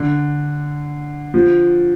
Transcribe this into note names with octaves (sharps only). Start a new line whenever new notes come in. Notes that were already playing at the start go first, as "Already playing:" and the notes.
Already playing: D3
F3